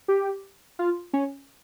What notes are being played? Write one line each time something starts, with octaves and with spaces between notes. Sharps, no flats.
G4
F4
C#4